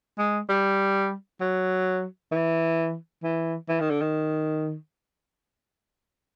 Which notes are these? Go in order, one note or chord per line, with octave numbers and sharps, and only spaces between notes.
G#3
G3
F#3
E3
E3
E3
D#3
D3
D#3